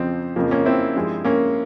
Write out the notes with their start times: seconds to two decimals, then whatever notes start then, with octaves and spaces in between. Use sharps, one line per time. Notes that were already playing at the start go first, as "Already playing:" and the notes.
Already playing: F2 C#3 F3 C4
0.36 F2 C#3 F3 A#3
0.51 A#3 C#4
0.65 C4 E4
0.95 G2 F3 G#3
1.24 A#3 C#4